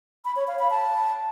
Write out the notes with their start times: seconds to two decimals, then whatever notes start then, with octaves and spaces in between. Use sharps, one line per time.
0.25 B5
0.36 C#5
0.48 F5
0.59 B5
0.70 A5